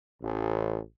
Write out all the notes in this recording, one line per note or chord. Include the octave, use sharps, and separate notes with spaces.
A1